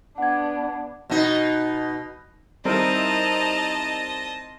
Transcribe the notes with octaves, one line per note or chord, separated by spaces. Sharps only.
B3 D4 F#5 G#6
B2 D#4
G3 C4 D#4 E4 A#4 D#5 A5